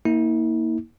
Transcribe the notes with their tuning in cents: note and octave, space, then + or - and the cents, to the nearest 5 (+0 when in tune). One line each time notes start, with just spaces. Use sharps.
A#3 +0 E4 -45